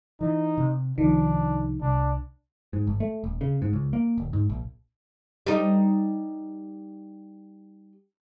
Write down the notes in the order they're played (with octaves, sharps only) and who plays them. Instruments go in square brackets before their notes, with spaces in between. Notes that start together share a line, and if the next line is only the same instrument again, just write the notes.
[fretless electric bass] E3 [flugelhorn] D#4
[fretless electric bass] C3
[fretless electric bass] C2 F3 [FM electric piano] D#3 [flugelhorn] D4
[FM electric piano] C2 [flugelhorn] D4
[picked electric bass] G#2
G#1
A3
D#1
C#3
G#2
C#2
A#3
D1
G#2
A#1
[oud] G3 D#4